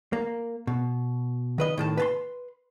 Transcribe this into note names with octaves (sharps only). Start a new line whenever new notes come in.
A#3
B2
D#3 B4 D#5
A2 D#3 A5
B4 A5 C6